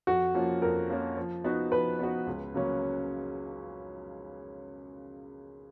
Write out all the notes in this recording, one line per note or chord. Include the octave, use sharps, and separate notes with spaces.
F2 F#4
F3 A#3 C#4 F4
F2 A#4
F3 A#3 C#4 F4
F3
B3 D#4 F#4
F3 B4
B3 D#4 F#4
C#2
C#3 F#3 A#3 C#4